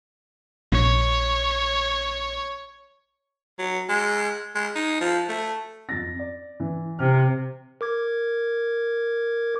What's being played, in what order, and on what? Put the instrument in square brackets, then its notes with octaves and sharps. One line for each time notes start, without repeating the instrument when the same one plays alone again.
[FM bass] A#1 [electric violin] C#5
[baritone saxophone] F#3
G#3
G#3
D#4
F3
A3
[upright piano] F2 A6 A#6
D5
E3
[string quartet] C3 [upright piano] F6
[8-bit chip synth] A#4 D6 G#6